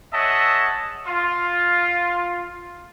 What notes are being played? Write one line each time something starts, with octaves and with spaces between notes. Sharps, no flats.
G#4 C#5 D#5 E5 F#5 A5
F4